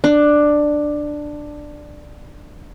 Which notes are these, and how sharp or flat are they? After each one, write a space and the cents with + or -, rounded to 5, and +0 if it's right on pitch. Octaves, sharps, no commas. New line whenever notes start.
D4 +10